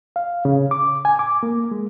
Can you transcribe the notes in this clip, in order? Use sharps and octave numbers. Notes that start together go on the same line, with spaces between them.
F5
C#3
D6
G#5
D6
A#3
G#3